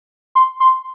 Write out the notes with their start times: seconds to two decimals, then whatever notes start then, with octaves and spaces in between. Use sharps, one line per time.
0.35 C6
0.60 C6